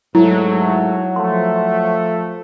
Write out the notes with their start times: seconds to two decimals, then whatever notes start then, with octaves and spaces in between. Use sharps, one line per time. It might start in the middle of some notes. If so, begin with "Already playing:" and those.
0.15 G#2 F#3 A3 E4
1.16 F3 A3 C6